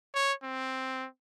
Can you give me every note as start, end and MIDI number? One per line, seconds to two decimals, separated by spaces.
0.15 0.33 73
0.43 1.07 60